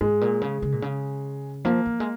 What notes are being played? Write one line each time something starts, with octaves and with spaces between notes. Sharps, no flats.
G#2 G#3
A#2
C#3
C#3
A#2
C#3
F3 A#3
F3
G#3